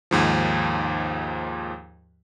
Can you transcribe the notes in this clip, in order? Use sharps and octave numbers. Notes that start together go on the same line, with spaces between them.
D#2 G#2 F3